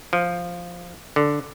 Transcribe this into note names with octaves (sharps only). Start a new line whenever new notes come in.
F3
D3